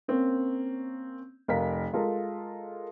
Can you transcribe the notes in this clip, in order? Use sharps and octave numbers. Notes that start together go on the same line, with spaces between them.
A#3 C4 C#4
F1 A#4 F5 B6
G#3 F4 A4 A#4